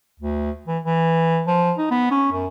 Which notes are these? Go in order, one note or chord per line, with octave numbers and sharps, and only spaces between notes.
D2
E3
E3
F3
D#4
B3
C#4
F#2